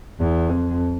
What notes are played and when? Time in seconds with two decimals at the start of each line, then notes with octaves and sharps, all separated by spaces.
0.20 E2
0.49 F2